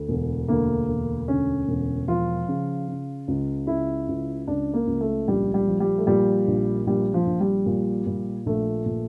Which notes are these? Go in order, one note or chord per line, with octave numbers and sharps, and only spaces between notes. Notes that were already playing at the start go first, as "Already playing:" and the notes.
Already playing: D2
E1
D2 A#3
E1
D2 C#4
E1
F3 F4
C#3
C#3
C#2
C#3 E4
C#2
C#2 D4
A#3
C#2
A3
A#1 G3
G3
F3
G3
A3
A#2 G3
A#1
A#1 G3
F3
A#1
G3
A#2
A#2
A#1 A3
A#2